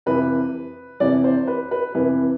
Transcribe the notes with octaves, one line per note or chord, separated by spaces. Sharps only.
F2 C3 E3 B4
F2 C3 E3 D5
C5
B4
B4
F2 C3 E3 B4